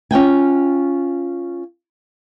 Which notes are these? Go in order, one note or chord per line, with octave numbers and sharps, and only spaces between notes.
C#4 F4 G5 G#5